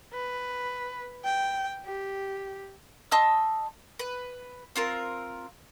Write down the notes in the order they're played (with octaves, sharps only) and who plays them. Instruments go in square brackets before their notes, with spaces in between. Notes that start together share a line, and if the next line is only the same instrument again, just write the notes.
[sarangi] B4
G5
G4
[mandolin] D#5 A5 C6 E6
B4
C4 F4 A#4